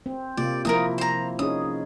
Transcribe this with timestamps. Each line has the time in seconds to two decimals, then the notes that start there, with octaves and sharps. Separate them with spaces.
0.06 C4
0.37 C3 A#3 F4 D5
0.65 F3 A#3 E4 A#4 A#5 D#6
0.98 C5 A#5
1.39 C#4 D#4 G#4 D#6